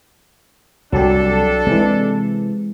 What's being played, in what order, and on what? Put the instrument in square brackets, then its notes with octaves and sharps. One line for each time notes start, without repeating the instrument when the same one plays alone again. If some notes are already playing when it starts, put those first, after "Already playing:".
[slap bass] C2 [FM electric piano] F#3 G4 [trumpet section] D4 A4
[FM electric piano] C3 E3 [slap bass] G#3